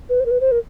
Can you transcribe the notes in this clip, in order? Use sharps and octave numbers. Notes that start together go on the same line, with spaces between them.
B4
C5
A#4
B4
C5
A#4